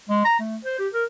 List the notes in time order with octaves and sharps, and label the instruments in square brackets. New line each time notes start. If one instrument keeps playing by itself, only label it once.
[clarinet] G#3
A#5
A3
C5
G4
A#4